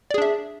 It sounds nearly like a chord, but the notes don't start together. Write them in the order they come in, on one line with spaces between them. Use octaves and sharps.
D5 G#4 D4 E5